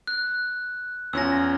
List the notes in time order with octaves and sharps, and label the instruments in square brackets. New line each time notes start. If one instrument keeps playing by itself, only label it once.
[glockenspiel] F#6
[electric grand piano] E2 C#4 F4 [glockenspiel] E6 A#6